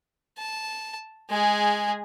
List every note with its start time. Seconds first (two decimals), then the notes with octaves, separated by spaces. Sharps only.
0.38 A5
1.30 G#3 G#4